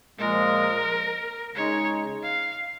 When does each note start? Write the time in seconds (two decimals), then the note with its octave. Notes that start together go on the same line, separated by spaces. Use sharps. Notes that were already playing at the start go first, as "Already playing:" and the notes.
0.18 A#2 F3 G#3 A#4
1.55 C#3 G#3 D#4 C#5
2.23 F5